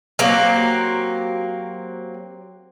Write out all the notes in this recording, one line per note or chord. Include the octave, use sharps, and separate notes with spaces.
F#3 A#3 C4 G4